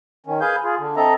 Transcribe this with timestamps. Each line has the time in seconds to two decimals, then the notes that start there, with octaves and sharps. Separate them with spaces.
0.26 D#3 C#4
0.41 G#4 B4 F5 G#5 G6
0.64 F4 G#4
0.79 D3
0.97 C4 A4 D#5 E5 A#5